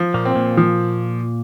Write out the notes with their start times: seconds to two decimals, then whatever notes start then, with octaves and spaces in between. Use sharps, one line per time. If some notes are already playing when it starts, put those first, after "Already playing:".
Already playing: F3
0.14 A#2 A#3
0.25 C4
0.35 A#2 A#3
0.57 F3